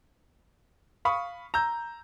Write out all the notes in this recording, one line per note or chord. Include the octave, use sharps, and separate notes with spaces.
F5 B5 C#6 D#6
A#5 E6 G6